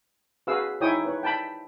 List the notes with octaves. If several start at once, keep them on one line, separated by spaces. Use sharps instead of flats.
F#4 G#4 B4 F5 E6
D#4 E4 C#5 G5 G#5 D#6
B4 C#5
G5 A5 B5